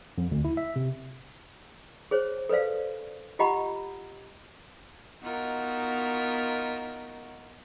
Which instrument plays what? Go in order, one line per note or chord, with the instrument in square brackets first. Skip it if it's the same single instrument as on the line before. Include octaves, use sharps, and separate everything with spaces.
[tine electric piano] F2
D2
E4
E5
C3
[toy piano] G#4 C5 C#5
A4 B4 C5 D5 F5
F4 G4 D#5 F#5 A#5 B5
[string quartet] B3 D#4 F4 F#4 A#4